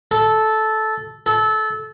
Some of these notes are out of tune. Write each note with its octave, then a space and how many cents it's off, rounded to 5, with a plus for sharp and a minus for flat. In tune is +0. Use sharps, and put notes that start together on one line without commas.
A4 -10
A4 -20